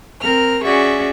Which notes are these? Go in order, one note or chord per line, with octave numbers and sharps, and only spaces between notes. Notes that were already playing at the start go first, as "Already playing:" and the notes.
C4 A#4 F6
C#4 F#4 G#4 D5 E5 C#6